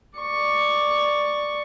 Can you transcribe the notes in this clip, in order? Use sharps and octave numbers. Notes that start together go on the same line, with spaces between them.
D5 C#6